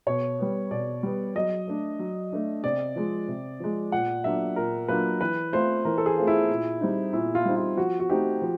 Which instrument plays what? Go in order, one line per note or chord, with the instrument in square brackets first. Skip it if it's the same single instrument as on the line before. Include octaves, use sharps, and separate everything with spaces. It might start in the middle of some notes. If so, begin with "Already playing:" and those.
[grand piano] B2 [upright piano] C#5
[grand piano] G3 B3
[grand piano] B2 [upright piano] D5
[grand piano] G3 B3
[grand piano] F#3 [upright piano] D#5
[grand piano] A3 D4
F#3
A3 D4
[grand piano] C3 [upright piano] D5
[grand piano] F3 G#3
C3
F3 G#3
[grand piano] A#2 [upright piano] F#5
[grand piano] F#3 A#3 D4 F4 [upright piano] E5
[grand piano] A#2 [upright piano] A#4
[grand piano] F#3 A#3 D4 F4 [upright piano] B4
[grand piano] E3 [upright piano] B4
[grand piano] A3 C4 F4 [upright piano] C5
[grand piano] E3 [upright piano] A#4
[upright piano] A4
G#4
[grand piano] A3 C4 F4
[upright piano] E4
[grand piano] A#2
G3 C4 D#4
[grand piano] A#2 [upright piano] E4
[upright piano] F4
[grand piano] G3 C4 D#4
[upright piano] F4
[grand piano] F3 [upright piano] F#4
[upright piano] F#4
[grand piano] A3 C4 D#4 [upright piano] G4
[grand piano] F3